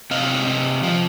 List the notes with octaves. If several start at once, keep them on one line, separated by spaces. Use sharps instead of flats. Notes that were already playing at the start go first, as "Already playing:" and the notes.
C3 D#5 F5
C3
F3